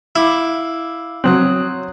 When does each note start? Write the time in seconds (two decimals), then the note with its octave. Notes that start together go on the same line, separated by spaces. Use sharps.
0.16 E4 F5 D6 E6
1.24 F#3 C4 C#5 D#6 F#6